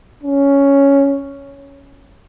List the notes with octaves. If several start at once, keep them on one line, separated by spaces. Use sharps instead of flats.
C#4